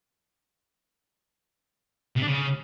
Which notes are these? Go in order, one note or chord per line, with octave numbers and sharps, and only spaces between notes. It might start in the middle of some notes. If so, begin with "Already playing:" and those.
C3
D4
C#3